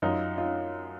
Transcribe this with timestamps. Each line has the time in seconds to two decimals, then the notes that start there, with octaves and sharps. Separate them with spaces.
0.02 F#2 D#4 F4
0.38 D#4 F4